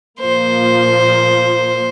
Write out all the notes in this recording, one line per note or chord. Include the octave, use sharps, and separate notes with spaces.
A#2 F3 A#3 C5